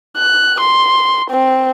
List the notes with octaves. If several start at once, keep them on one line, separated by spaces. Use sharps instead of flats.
F#6
C6
C4